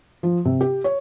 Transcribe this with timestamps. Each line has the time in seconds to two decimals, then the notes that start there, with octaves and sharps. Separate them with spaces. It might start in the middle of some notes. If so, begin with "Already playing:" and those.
0.23 F3
0.45 C3
0.61 G4
0.84 C#5